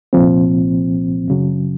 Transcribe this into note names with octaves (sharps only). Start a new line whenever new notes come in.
C2 A#2 F3 C4
F#2 C#3 F#3